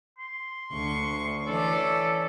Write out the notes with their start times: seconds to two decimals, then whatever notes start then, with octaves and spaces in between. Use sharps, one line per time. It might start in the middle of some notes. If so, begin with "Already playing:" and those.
0.18 C6
0.71 D2 C#6
1.45 E3 C#4 A4 D5